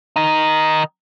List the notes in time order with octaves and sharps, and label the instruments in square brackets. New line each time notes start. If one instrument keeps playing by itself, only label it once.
[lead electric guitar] D#3 D#4